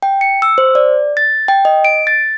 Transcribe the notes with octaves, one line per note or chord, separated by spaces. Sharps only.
G5
C#7
E6
C5
D5
A6
G5
D#5
D7
A6